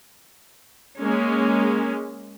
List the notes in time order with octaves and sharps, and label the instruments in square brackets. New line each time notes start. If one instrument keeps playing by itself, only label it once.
[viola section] G#3 A#3 C#4